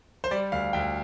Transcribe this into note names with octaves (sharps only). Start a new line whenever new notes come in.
C5
G3 D5
D2 F5
D2 G5